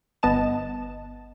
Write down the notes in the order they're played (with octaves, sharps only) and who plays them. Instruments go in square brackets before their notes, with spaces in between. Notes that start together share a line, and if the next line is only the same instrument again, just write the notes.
[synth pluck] G1 B3 D#5 A5 E7